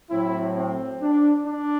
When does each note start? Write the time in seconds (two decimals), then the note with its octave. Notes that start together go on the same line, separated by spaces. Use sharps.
0.11 A2 F#3 C4 E4
0.57 C4
1.02 D4
1.47 D4